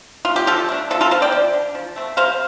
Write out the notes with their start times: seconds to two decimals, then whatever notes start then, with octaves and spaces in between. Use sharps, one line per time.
0.25 F4
0.36 G4
0.47 F3 F4 A4
0.68 A3 D4
0.90 F3 F4 A4
1.01 F4 A4
1.11 C4 C5 F5
1.22 D5 G5
1.32 F3
1.53 D4
1.75 F3
1.96 A3 C4
2.17 C3 C5 F5